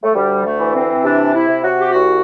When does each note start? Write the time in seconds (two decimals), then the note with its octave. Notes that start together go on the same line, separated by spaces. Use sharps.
0.03 A3
0.14 D2 G3
0.44 A3
0.60 E3
0.74 C4
1.03 C3 D4
1.34 E4
1.48 C3
1.63 F#4
1.81 G4
1.92 C2 F#4